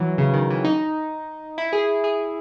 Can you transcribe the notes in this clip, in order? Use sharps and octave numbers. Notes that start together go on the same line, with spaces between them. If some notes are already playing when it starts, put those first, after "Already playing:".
Already playing: E3 F#3
C#3
D#3
E3
D#4
E4
G#4
G#4